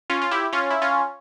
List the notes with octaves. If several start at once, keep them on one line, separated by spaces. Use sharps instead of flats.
C#4 F4
F4
E4 G4
C#4 F4
E4
C#4 F4